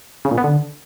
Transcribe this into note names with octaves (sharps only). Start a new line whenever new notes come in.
C#3
A#2
B3
D3